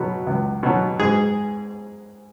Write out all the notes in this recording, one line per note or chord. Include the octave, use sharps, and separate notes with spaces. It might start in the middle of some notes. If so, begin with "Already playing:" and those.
Already playing: B2 F#3 B3
C#2
B2 F#3 B3
G#2 G#4